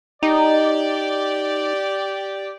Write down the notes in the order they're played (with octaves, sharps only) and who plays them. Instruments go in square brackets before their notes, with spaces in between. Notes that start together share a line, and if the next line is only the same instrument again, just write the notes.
[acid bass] D#4 [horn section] G4 D5